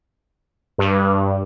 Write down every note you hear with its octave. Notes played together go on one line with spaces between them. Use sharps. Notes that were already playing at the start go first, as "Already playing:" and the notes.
G2